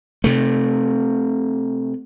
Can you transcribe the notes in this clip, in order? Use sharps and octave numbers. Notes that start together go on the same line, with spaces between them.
C3 A3